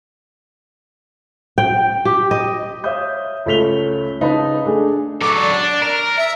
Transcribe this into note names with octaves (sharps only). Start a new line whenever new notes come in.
G5
G4
D#5
C#5 E5 F5 D#6 G6
C#2 A3 C#4 B6 F7 G7
C#3 D#4 B4 A5 B5
A3 D4 G#4
F#3 A4 D6
D5
D4
A#4
E5